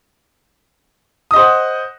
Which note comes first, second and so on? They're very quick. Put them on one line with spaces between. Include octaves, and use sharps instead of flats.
D#6 D#5 C5 F#5